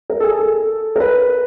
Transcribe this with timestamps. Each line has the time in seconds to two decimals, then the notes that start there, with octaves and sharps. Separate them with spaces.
0.10 A#4
0.20 A4
0.24 G#4
0.39 A4
0.96 A#4
1.00 B4